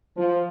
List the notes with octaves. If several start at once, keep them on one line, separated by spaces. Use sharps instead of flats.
F3